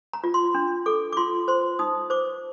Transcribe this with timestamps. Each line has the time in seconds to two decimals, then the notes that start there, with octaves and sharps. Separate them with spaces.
0.13 A#5
0.24 F4
0.34 C6
0.55 D4
0.86 A4 D6
1.13 D6
1.17 F4 C6
1.48 C5 C6
1.79 D#4 D#6
2.10 C5 D6